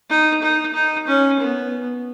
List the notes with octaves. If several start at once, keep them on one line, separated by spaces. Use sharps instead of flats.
D#4
D#4
D#4
C#4
B3